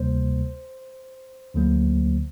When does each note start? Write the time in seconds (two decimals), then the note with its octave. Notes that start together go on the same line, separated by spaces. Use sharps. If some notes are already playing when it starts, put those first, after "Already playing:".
Already playing: D2 C3 G3 A#3 C5
1.55 D2 D3 F#3 A#3